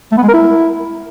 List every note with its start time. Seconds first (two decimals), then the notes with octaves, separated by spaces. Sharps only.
0.12 A3
0.17 B3
0.23 G#3
0.28 A#4
0.34 E4